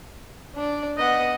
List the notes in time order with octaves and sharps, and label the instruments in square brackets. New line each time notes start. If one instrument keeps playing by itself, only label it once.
[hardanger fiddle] D4 D5
[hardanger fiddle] B3 F#5 [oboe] D#5